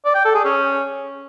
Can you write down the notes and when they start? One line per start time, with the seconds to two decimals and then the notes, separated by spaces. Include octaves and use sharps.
0.05 D5
0.15 G5
0.25 A4
0.35 G#4
0.45 C#4